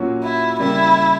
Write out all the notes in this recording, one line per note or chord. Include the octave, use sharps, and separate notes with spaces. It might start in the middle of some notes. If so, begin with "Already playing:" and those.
Already playing: A#2 F#3 C#4 F#4
E4
C#3 G3 A#3 E4